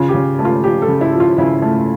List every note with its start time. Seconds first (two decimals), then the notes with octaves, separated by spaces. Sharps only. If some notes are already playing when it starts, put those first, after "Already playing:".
Already playing: C#3 F4
0.09 G4
0.14 C#3
0.39 A3
0.45 F4
0.64 F3 G4
0.82 A4
0.88 C#3
1.01 E4
1.13 F3
1.20 F4
1.38 C#3 E4
1.62 A3